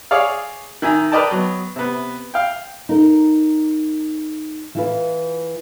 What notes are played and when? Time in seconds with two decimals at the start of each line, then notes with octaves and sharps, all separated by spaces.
0.11 G#4 C#5 D5 F5
0.82 D#3 E5 G#5 A#5
1.12 A#4 B4 D5 D#5 G5 A5
1.31 F#3 B3
1.76 C3 B3
2.34 F5 G5
2.89 D#4 A#4
4.75 E3 F4 B4